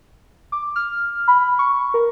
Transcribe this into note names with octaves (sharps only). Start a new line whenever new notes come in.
D6
F6
B5
C#6
A#4